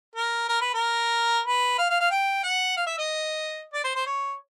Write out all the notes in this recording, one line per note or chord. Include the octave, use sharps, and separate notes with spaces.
A#4
A#4
B4
A#4
B4
F5
F5
F5
G5
F#5
F5
E5
D#5
D5
C5
C5
C#5